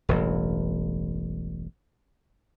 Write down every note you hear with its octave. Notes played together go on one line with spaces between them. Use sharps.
E1 A1 G2